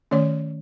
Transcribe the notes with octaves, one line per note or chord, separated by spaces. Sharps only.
D#3 A3 C#4 C#5